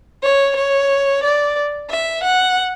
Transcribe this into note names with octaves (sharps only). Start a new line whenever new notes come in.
C#5
C#5
D5
E5
F#5